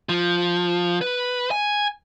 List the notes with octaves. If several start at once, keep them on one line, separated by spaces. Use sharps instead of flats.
F3
B4
G#5